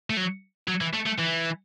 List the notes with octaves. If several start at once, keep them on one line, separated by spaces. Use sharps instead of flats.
A3
F#3
F#3
E3
A3
A3
E3